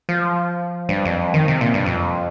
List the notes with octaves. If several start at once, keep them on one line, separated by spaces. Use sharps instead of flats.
F3
G2
F2
D#3
C3
A#2
G2
F2